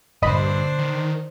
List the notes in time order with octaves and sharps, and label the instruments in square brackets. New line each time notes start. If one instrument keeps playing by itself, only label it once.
[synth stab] A#1 D#5 B5 [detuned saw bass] G2 [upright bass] A#2 D3 [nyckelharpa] D4 C5
[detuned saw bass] D#3